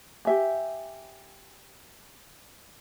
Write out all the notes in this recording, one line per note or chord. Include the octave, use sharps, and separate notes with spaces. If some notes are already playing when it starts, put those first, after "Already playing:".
G4 E5 G#5